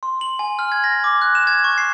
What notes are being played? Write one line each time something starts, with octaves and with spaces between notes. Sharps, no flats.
C6
F#7
G#5
F6
G#6
A#6
D6
F#6
E7
G#6
C#6
C7